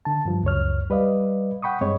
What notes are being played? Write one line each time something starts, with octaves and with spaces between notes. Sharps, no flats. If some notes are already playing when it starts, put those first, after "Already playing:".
D3 A5
G2 F3
C#2 F#2 C#5 F6
G3 B4 D5 D#5 F5
F#5 G5 B5 C#6 D#6
G2 G#3 C4 C#5 D#5 C#6